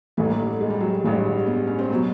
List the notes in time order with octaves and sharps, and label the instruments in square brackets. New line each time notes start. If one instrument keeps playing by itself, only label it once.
[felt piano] A1 G2 E3 A3
A#3
A3
G#3
G3
F#3
G3
A1 G2 E3 G#3
B3
C#4
C4
B2 F#3 B3